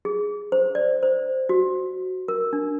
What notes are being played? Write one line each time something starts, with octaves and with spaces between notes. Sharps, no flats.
G#4
C5
D5
C5
F#4
A#4
D4